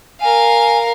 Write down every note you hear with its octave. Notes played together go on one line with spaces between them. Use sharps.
A#4 F5 G#5